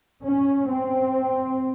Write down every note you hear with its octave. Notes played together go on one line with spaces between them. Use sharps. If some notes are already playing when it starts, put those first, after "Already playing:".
C#4
C4